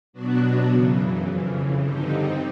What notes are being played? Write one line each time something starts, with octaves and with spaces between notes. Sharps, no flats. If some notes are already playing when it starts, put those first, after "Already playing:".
B2 F#3 B3 D4 F#4
F#2 C#3 E3
F2 C#3 E3
G2 D3 G3 C4 D#4